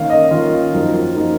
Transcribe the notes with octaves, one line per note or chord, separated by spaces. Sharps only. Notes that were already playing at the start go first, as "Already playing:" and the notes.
Already playing: D#3 A#3 C#4 F5
D#5
D#3 A#3 C#4 F4
F#2 F3 A#3 D#4
F3 A#3 D#4